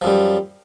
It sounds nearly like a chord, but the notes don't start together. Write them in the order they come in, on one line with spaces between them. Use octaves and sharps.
F3 F#2 G3